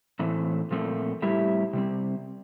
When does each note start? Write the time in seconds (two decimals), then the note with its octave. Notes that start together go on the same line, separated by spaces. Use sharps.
0.19 A2 E3 A3 C4
0.71 A#2 F3 A3 C4
1.22 A2 G3 C4 E4 G4
1.73 C3 G3 C4